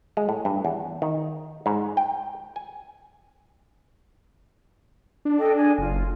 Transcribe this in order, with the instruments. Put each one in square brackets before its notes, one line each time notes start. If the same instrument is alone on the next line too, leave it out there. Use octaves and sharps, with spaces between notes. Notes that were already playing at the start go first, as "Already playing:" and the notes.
[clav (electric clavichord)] G#3
A2
G2
E2
D#3
G#2
G5
G#5
[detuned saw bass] D4
[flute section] A4 D#5 G5
G#4 D5 G#5
[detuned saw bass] F#1 [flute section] F4